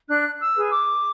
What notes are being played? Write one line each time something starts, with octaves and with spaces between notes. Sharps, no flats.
D4 F#6
E6
G#4 B4
D6